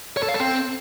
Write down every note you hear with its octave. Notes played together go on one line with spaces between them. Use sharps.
C#5
A4
F5
A4
C4